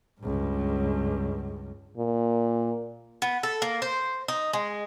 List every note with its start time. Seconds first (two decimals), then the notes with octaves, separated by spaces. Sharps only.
0.21 C#2 G2
1.97 A#2
3.22 B3
3.43 A4
3.62 A#3
3.82 C5
4.28 D#4
4.53 G#3